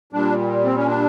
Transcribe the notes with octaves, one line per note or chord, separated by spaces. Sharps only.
A#2 G3 D4
C4
C#4
D4